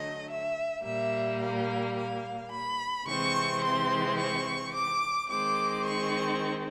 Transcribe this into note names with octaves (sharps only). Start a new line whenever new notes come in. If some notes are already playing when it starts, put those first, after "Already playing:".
Already playing: D3 F#3 A3 D#5
E5
A#2 G3 A#3 E5
F5
F5
B5
C3 E3 G#3 C4 C#6
C6
C#6
D6
D#3 G#3 C4 D6
C#6